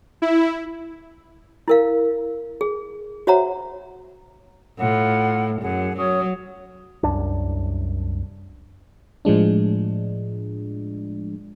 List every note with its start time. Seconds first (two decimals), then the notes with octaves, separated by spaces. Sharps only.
0.22 E4
1.68 E4 A#4 F5
2.61 G#4
3.27 F#4 C5 C#5 E5 F#5 A#5
4.79 A2 F4 F5 F#5
5.62 F#2 G#4 F#5
5.97 F#3 C#4 C#5 D#6
7.03 C2 F#2 D4
9.25 A2 F3 G#3 D4